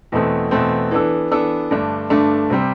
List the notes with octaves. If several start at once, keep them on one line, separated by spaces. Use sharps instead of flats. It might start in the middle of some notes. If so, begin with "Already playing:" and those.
E2 B2 A3 C4
E2 B2 A3 C4
E3 B3 D4 A4
E3 B3 D4 A4
G2 D3 A3 D4
G2 D3 A3 D4
C3 G3 C4